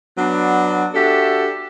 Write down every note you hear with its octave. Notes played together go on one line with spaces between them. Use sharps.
F#3 B3 D4
D4 F#4 G4 A4 E5